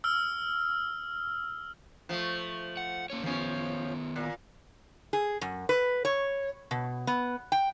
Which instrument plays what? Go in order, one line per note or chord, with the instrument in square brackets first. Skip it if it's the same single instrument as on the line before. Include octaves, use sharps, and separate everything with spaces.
[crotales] E6 F6
[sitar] F3 A3
[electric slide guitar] F#5
A#3 C#4 C#5
[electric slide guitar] D#3 B3 [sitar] F3 C#4
[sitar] A#2
[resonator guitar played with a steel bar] G#4
F#2
B4
C#5
B2
B3
G5